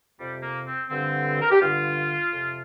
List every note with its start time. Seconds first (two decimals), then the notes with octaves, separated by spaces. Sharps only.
0.19 F2 C3 G3
0.42 A#3
0.67 C4
0.89 G2 D3 C4
1.42 A#4
1.51 G4
1.60 G2 D3 F4
2.32 F2 C3